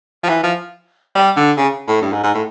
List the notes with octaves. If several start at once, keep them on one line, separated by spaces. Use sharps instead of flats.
F3
E3
F3
G3
D3
C#3
A2
G2
G#2
G#2
A2